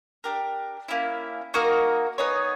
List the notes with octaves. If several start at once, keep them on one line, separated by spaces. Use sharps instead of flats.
D4 G4 A#4
A#3 C#4 E4
A#3 D#4 F#4 A#4
B3 D#4 G#4 C#5